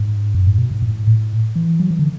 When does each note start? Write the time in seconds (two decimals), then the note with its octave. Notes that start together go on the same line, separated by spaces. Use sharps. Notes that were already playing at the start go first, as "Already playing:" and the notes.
Already playing: G#2
0.35 F#2
0.47 G#2
0.58 B2
0.71 G#2
0.82 A2
1.07 A2
1.56 E3
1.80 F#3
1.91 E3
1.99 D3